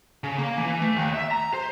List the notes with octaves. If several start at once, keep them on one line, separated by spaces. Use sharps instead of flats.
C#3
A#3
E3
A3
D#2
E5
A#5
C5